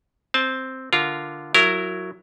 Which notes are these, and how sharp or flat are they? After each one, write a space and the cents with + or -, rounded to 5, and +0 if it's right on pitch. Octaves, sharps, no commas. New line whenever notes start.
C4 +0 A5 -25
D3 +0 F4 -10 A#4 +0
F#3 +0 E4 +20 A#4 -15